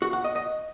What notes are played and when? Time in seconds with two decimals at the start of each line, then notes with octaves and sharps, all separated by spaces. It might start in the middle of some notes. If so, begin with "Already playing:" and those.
0.02 F#4
0.13 F#5
0.24 D#5
0.36 D#5